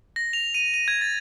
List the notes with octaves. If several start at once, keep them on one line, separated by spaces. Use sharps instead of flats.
A#6
F7
D#7
D#7
G#6
A6